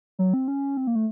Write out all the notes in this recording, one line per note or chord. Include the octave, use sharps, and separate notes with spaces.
F#3
C4
C#4
C4
A#3
A3